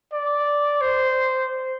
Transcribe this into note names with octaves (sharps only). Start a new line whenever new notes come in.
D5
C5